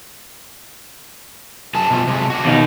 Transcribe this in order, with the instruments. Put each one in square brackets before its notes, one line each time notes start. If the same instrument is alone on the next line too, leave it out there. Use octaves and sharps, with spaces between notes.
[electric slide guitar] F#2 G#4 A5
B2 F3 A3
C3 G#3 A3
D4 F#4
[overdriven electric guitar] D#2 D#4 [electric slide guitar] B2